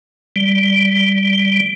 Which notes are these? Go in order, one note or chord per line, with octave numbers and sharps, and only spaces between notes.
G3